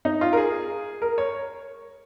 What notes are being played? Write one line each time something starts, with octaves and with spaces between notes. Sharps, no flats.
D#4
F4
A#4
G#4
A#4
C#5